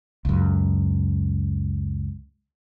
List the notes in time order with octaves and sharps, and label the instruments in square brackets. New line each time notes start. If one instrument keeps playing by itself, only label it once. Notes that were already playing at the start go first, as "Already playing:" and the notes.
[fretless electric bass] C#2 F#2